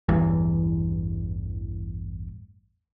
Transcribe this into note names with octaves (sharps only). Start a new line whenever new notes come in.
A1 E2 G2 E3